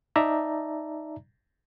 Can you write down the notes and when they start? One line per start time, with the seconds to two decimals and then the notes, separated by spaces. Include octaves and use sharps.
0.16 D#4 D5 E5 A5 A#5